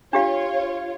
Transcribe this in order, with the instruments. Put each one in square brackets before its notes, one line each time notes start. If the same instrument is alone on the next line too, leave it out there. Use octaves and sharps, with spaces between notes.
[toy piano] D4 G4 F5 [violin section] F4 C#5